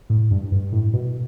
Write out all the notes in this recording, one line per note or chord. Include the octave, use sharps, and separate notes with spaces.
A2
G2
G2
A2
B2